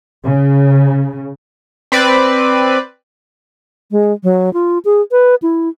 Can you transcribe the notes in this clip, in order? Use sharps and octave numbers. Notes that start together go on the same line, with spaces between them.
C#3
C4 B4 D5
G#3
F#3
F4
G#4
B4
E4